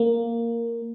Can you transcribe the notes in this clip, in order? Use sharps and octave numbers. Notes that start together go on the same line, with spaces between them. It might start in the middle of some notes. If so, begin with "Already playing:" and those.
Already playing: A#3